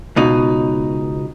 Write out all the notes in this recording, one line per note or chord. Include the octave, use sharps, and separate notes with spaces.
C#2 B2 D#4